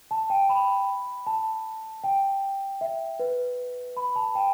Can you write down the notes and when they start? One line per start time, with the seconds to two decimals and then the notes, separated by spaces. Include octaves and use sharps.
0.11 A5
0.30 G5
0.49 B5
1.26 A5
2.04 G5
2.81 E5
3.20 B4
3.97 B5
4.16 A5
4.35 G5